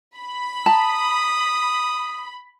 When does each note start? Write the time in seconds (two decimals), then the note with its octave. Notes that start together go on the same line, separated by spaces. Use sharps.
0.18 B5
0.66 A5 A#5 D#6